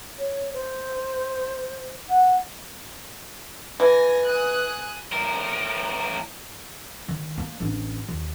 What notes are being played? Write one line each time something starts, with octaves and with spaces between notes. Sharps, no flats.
C#5
C5
F#5
E3 G#5 A#6
G#5 D#6 F#6
A2 A#4
D#3
A#3
A1 D4
D#2